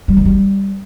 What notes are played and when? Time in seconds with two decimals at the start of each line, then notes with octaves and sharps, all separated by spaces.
0.08 G3
0.17 D#3
0.25 G3